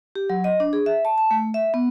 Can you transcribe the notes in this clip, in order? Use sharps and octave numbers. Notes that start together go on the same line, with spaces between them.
G4
F#3
D#5
D4
G#4
E5
A5
A5
A3
E5
B3